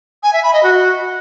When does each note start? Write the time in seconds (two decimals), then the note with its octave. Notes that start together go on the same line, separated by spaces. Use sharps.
0.23 G#5
0.33 E5
0.43 B5
0.53 D#5
0.63 F#4